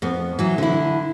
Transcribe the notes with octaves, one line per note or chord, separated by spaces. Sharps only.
F2 B3
E3 F#3
D3 E4